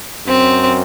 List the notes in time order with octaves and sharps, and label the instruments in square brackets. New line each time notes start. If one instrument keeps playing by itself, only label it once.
[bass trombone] F#2 [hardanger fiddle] C4